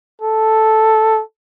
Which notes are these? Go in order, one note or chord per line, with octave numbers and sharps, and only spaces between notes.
A4